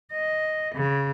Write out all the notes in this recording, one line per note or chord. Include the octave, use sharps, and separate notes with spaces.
D#5
C#3